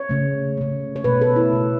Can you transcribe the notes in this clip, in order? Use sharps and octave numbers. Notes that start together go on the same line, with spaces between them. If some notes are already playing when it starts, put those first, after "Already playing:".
Already playing: C#5
C#3 A3
C#3 A3
C#5
B2 A3 B4
A4
E4
B2 A3